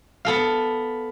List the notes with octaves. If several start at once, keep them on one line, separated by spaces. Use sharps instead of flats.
B3 A4 F5